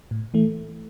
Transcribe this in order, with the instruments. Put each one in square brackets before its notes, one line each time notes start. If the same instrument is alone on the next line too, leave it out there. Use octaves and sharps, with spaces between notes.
[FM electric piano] A2
E3 A3